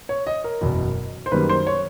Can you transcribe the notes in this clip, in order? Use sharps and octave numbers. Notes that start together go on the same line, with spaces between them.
C#5
D#5
A#4
F#1 E2 B2
C5
F#2 D#3 G3 A#3 B4
C5
C#5